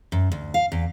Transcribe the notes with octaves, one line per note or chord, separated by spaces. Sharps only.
F#2
D2
F5
E2